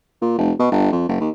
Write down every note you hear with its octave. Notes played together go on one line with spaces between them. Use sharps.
A#2
F1
B2
G1
F2
F#1
D#2